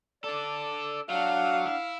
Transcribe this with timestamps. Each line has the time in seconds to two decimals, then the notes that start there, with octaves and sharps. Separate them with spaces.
0.24 D4 A4 D5
1.10 F#3 D4 F5 F#5
1.66 E4